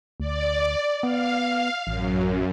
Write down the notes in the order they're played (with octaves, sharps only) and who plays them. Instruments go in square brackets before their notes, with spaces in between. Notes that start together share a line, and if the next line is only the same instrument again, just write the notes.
[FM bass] D2 [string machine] D5
[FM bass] B3 [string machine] F5
[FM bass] A1 [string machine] F#2